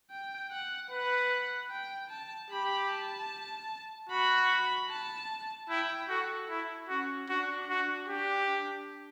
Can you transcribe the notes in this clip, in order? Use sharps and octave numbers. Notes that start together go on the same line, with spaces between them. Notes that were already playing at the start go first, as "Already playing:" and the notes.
G5
F#5
B4 F#5
G5
A5
G4 B5
A5
F#4 B5
B5
A5
E4 G5
F#4 A4
E4
C#4 F#4
D4 F#4
F#4
D4 G4